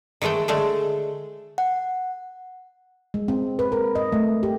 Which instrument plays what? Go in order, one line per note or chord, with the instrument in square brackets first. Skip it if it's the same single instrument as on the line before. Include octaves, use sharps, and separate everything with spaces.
[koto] D#3 E3 G#3 A3 G5
D3 G#3 A3
[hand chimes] F#5
[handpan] G#3
C4
B4
A#4
D#5
A3
G4